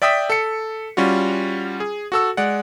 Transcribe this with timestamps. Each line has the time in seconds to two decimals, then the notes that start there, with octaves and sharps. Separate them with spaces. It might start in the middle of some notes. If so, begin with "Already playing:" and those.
0.02 D5 E5 G5 D#6 E6 B6
0.30 A4 C#7
0.97 G3 C#4 F4 F#4
1.80 G#4
2.12 F#4 A4 E6
2.37 G#3 D5 F#5